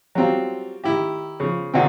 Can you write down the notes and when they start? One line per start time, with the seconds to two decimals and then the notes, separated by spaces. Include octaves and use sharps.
0.15 F#3 G3 C4 F4
0.84 D#3 E4 G4
1.40 C#3 F3
1.74 A#2 D3 D#3 C4